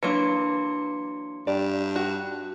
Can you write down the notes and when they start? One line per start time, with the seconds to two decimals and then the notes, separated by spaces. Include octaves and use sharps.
0.03 E3 F#3 A#3 D4 C6 C#7
1.47 G2 D5
1.96 F#4 F#6